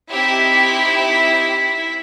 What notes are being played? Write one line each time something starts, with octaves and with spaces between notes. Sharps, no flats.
C4 D#4 E4 G4 E5